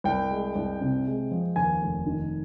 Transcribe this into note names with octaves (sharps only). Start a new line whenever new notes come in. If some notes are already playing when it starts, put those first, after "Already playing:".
C2 G5
G#3
C2
C3
G#3
F3
D#2 G#5
F1
D#3